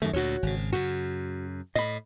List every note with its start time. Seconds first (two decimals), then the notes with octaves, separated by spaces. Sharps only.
0.02 F#2 D#3 A3
0.13 D2 A#2 F#4 C#5
0.43 G#1 C#3
0.73 F#2 C#3 F#4
1.75 A2 D#5 B5